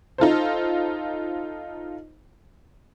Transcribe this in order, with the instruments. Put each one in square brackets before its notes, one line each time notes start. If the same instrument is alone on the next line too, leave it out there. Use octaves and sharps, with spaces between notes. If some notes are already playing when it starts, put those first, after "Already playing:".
[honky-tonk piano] D#4 F4 A4 C5